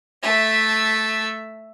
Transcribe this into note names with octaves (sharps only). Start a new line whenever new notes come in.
A3 E5